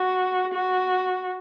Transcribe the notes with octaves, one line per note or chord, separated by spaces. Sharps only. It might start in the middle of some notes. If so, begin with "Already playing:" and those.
Already playing: F#4
F#4